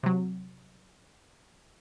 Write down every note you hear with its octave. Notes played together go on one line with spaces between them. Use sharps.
C3 F#3